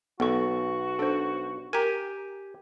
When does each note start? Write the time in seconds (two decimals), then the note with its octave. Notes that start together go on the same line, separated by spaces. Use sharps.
0.20 B1 B3 F#4 A4 C#6
0.99 D4 A4 C5
1.73 G4 A#4 G#5 A#5